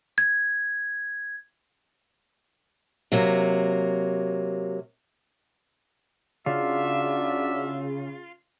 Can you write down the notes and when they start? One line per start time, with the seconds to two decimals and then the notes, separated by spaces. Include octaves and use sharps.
0.18 G#6
3.12 C3 F#3 A#3
6.46 C#3 A#3 D4 F4 F#4 E5